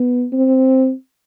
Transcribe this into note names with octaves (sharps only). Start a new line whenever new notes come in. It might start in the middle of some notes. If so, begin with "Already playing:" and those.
Already playing: B3
C4